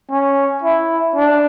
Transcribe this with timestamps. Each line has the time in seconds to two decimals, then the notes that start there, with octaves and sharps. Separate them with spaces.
0.11 C#4
0.63 E4
1.16 D4